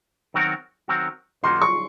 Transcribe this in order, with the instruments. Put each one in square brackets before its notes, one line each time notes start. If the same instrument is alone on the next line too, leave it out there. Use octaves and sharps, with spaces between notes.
[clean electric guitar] D#3 F#3 C4 F#4 A#4
D#3 F#3 C4 F#4 A#4
[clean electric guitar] F#2 D#3 A#3 D#4 F#4 [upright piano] C6
[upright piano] C#6